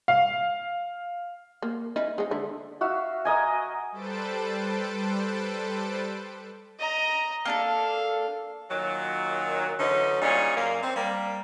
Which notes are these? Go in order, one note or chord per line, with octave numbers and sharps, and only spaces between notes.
F5
A#3
C#4 D#4 E4
G#3 D#4
D3 E4
F#4 E5 F5
A#4 D#5 G#5
G3 A4 B4 C5 A5 D7
D#5 A#5
A#3 D4 A4 F5
A#2 D#3 F#3
D3 E3 F#3 C#4 D#4
A#2 G3 C#4 D#4 G#4
F#2 A#3
C4
G3 A#3